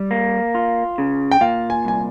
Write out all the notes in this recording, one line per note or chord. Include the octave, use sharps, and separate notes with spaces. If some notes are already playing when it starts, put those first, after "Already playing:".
Already playing: G3
A#3
F4
C#3
G5
A#2 F5
G#5
C2 G#5